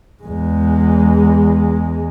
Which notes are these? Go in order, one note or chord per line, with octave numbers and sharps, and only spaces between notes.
E2 G#3